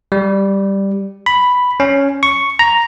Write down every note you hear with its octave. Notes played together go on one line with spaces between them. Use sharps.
G3
B5
C#4
C#6
A#5